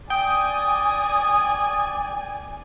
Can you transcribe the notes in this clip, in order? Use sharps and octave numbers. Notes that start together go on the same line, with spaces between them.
D5 G5 G#5 D#6